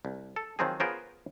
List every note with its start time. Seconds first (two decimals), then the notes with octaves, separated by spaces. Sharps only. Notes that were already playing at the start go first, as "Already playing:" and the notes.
0.05 C2
0.36 A4
0.59 D#3 F3 F#3 C4 D#4 G#4
0.80 B3 F4 G#4 A#4 C5 C#5